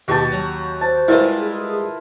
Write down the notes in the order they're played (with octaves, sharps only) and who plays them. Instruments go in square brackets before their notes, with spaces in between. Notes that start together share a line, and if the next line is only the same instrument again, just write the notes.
[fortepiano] D#2 G4 [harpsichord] B2 [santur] F#4 A5
[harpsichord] F#3
[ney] C5 [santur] A5
[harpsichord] G3 G#3 [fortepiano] E4 A#4 B4 [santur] F4
[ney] G#4